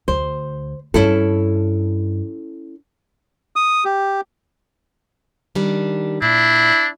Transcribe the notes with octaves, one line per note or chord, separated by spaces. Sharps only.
D2 C5
G2 C#4 E4 A4
D#6
G4
D#3 G3 D4
A#2 D4 E4